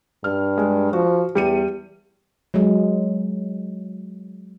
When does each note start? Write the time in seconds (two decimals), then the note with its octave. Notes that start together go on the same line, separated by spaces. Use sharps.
0.24 G2 F6
0.58 G#3
0.93 F3 F#4
1.35 E2 G3 C#7 D#7
2.54 F#3 G#3